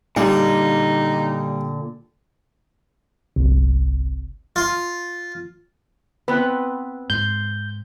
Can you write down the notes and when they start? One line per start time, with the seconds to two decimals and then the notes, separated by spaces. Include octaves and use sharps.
0.16 A#2 D3 G3 D#4
3.36 G1 C2 C3
4.56 F4
6.28 B3 C4 B4
7.10 G#2 C6 G6